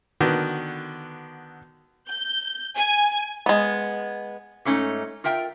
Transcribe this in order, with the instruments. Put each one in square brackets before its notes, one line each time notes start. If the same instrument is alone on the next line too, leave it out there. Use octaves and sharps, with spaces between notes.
[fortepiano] D3 D#3 B3 F#4
[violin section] G6
G#5
[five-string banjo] G#3 B3
[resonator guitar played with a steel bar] G#2 A3 C#4 D#4
F4 A#4 E5 G5